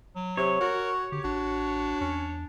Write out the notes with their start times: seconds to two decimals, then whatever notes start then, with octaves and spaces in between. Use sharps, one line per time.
0.16 F#3
0.37 C3 C#5
0.61 F#4 A#4
1.12 D3 G4
1.24 A1 D4 F#4
2.01 E2 C#4